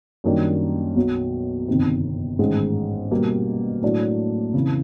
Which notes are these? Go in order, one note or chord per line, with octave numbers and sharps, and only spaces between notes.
F#2 D#3 G3 A#3 D4
B1 B2 F#3
G1 F2 C3 D#3
A1 G#2 D#3 G#3
B2 G3 A#3
A2 F#3 A#3 D4
F2 C#3 E3